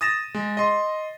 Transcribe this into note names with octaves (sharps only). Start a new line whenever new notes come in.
D#6 A6 A#6 E7
G#3
D#5 C6